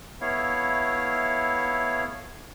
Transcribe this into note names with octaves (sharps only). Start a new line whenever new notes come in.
A3 B3 E4 C#5 F5